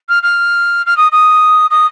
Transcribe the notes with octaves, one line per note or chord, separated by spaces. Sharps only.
F6
F6
F6
D#6
D#6
D#6